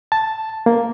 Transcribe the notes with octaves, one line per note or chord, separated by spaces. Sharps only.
A5
A#3